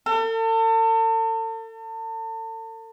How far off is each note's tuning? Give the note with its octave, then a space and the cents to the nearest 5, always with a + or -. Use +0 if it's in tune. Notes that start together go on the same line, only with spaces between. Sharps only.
A4 +40